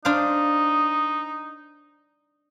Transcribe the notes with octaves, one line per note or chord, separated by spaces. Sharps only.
D4 D#4 C5 F5